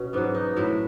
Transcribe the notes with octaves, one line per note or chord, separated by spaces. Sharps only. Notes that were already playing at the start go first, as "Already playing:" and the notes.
Already playing: B2 C#4
G#2 F#3 B3
D#4
A2 F#3 E4